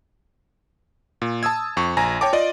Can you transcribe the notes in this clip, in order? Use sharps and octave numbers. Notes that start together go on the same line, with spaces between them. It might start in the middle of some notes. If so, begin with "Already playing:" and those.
A#2
A5 D#6 E6 G#6
F2 C#6
A#1 G#5 A#5 A#6
C#5 G5 A5 D6
F4 D5 D#5